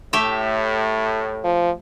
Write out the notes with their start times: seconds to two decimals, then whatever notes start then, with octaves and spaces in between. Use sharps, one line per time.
0.13 A2 A3 G4 E5
1.44 F3